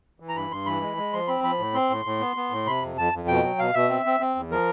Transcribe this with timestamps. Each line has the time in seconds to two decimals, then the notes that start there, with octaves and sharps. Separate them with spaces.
0.20 E3
0.29 A#5
0.35 G2 B5
0.51 G2 C6
0.66 E3 B5
0.81 G#3
0.97 G#3
1.13 F3 C6
1.28 C4 B5
1.43 F3 B5
1.58 A2
1.74 C4 C6
1.90 A2
2.05 A2
2.20 B3
2.36 B3
2.51 A2
2.66 C3 B5
2.82 F2
2.97 F2 A5
3.13 F2
3.28 B2 G5
3.43 F#3
3.59 B2 F5
3.74 B2 E5
3.89 C4
4.06 C4
4.20 C4
4.35 E2
4.51 F3 A#4